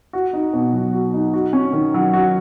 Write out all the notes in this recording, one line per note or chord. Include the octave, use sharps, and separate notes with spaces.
F#4
D#4
B2
F#3
F#4
D#4
F#4
C#4
D#3
F#3
F#4